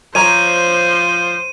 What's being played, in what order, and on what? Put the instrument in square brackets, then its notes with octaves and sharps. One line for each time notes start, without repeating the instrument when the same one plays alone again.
[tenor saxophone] F3 [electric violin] C5 [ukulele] C#5 A#5 [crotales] D#7